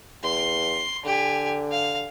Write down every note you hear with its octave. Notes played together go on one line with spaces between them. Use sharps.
E2 C6
D3 G4 G#5
F5